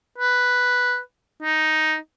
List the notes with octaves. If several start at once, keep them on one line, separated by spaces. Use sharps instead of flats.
B4
D#4